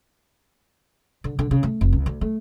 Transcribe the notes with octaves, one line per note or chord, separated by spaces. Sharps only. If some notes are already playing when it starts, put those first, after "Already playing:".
D3
D3
C#3
A3
F1
C#2
D2
A3